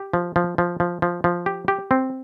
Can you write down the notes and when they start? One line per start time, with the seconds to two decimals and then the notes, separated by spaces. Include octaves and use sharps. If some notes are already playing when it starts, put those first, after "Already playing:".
Already playing: G4
0.13 F3
0.36 F3
0.58 F3
0.80 F3
1.02 F3
1.24 F3
1.46 G4
1.68 G4
1.91 C4